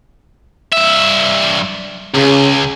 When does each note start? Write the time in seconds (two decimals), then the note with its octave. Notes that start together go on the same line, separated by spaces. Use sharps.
0.73 G2 E5
2.15 C#2 C#3